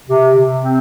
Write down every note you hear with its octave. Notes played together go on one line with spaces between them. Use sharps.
C3
C3
C4